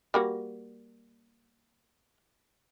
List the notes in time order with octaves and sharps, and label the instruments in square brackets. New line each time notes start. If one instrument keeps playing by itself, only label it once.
[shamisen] G3 A#3 F#4